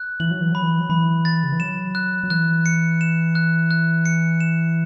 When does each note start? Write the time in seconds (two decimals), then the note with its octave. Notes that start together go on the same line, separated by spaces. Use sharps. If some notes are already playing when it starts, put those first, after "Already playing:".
Already playing: F#6
0.20 E3 F#7
0.31 F#3
0.41 E3
0.52 F#3 B5
0.63 E3
0.80 F#3
0.89 E3 B5
1.25 A6
1.43 C#3
1.52 E3
1.60 F#3 E7
1.95 F#6
2.23 F#3
2.30 E3 F#6
2.66 C#7
3.01 E7
3.35 F#6
3.71 F#6
4.06 C#7
4.40 E7